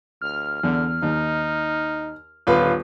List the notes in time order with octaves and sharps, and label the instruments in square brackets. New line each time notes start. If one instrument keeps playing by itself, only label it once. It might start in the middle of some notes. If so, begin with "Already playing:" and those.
[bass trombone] D2 [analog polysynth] F6
[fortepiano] E2 [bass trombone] D3
[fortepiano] D#2 [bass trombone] D#4
[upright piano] D#1 F4 B4 [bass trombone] D3 [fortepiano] B3